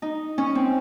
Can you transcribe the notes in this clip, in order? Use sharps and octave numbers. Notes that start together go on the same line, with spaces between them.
D#4
C#4
C4